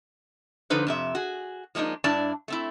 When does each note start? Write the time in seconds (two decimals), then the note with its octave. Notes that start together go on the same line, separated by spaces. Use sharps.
0.70 D3 F3 D#4 B4 C5
0.87 F2 C3 E5
1.15 F#4 G#4
1.75 F3 G#3 A#3 D4 D#4
2.04 G2 D4 E4 D5 A5
2.48 A3 C4 E4